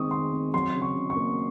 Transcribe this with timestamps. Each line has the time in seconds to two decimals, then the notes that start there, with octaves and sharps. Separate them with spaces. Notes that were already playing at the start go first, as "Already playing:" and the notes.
Already playing: D#3 G#3 C4 C#6 D#6
0.10 D#3 C6
0.32 C4
0.54 F#3 C6
0.74 C#3
0.82 C#6
0.96 C#3
1.10 C#6
1.16 A#3